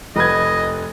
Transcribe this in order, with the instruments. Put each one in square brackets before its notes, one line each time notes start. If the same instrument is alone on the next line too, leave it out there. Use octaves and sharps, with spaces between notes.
[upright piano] F1 B4 G#6 [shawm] D#5